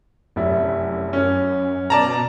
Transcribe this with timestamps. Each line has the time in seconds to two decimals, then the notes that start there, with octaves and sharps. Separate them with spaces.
0.36 F1 F#2 E4
1.13 C#4
1.90 B2 D5 A5 A#5